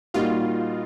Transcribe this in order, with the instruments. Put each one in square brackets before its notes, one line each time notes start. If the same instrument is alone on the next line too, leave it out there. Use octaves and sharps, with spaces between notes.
[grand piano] A#2 G3 A#3 D#4 F#4 [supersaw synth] F4